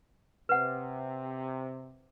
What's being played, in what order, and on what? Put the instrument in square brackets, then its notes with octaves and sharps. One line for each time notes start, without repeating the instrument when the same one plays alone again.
[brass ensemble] C3 [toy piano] B4 F#5